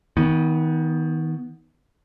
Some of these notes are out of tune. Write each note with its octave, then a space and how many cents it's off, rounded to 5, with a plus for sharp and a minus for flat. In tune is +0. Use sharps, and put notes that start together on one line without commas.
D#3 +35 B3 +0